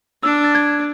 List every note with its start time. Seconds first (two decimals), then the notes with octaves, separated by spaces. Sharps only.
0.23 D4 E6
0.44 A6
0.55 G#6